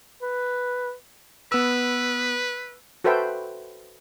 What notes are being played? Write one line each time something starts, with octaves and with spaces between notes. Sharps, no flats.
B4
B3 B4 E6
F#4 A4 B4 C5 E5 G5